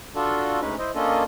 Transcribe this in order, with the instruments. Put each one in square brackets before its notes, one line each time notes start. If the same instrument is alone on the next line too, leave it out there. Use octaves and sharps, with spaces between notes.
[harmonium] D4 F4 F#4 A4
D2 G#3 C#4 D#4 B4
E4 C5 D#5
A#3 C#4 D4 F4 A4 D#5